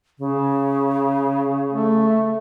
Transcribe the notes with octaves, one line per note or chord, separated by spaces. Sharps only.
C#3
A3